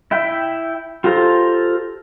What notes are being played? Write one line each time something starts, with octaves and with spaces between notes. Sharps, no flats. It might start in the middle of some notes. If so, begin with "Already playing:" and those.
E4 E5 G5
F4 G4 A4 C5 A#5